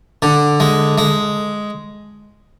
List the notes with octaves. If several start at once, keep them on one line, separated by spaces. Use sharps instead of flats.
D3
G#3
G#3